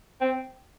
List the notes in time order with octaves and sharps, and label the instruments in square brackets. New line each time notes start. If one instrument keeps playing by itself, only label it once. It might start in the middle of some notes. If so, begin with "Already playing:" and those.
[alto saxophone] C4